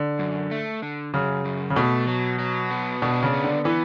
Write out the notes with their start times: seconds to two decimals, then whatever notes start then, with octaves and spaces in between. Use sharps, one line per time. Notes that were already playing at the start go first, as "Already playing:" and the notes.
Already playing: D3
0.19 F#2
0.51 A3
0.82 D3
1.14 F#2 C#3
1.45 F#2
1.70 C#3
1.76 B2 A3
2.08 F#3
2.39 F#3
2.71 B3
3.02 B2 D4
3.23 C#3
3.33 B3
3.44 D3
3.65 E3 B3